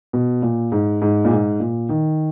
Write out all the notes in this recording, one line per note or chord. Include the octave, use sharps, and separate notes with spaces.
B2
A#2
G#2
G#2
A#2
G#2
A#2
D#3